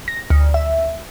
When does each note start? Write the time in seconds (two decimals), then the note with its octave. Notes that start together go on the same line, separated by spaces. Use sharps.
0.08 A#6
0.30 D2
0.54 E5